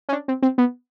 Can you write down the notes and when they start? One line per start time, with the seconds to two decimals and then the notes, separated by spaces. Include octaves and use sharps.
0.09 C#4
0.12 D4
0.28 C4
0.42 C4
0.58 B3